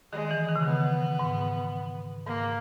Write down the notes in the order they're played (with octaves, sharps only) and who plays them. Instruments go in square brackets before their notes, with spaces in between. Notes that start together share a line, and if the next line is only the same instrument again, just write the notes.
[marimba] D#3 [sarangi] G#3
[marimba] E3
D#3
C#3
[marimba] D#3 [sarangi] B3
[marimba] G#2
[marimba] G#2 [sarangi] A#3